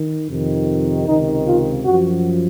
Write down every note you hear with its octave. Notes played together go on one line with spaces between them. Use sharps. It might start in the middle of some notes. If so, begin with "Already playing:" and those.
Already playing: D#3
F2 C3 D#3
C#2 C3 D#3 D#4
F4
F#2 F3 F#4